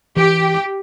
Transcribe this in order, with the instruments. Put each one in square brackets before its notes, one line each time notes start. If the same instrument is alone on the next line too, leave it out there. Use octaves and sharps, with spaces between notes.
[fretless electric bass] E3 [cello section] G4